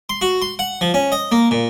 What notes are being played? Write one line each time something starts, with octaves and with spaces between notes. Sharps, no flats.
C6
F#4
C6
F#5
F3
C#4
D#5
A#3
A#2